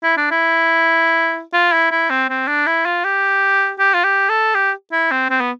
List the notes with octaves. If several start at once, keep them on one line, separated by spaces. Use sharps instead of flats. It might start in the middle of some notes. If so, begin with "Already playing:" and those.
E4
D4
E4
F4
E4
E4
C4
C4
D4
E4
F4
G4
G4
F4
G4
A4
G4
E4
C4
C4
B3